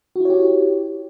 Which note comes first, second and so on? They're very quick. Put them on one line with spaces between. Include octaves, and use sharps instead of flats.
F#4 E4 C#5 G4